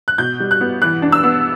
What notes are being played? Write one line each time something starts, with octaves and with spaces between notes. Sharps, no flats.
F#6
B2 G6
G3
F#6
B3
E3 F#6
D4
E6
B3